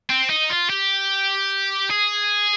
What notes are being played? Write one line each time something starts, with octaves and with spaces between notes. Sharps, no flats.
C4
D#4
F4
G4
G#4